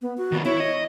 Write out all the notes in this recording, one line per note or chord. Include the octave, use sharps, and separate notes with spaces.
B3
F#4
D#3 B3
E4 C#5
D#5